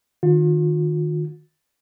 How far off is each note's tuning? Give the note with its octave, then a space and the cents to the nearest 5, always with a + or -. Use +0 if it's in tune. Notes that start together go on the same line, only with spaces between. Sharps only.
D#3 -20 F4 +40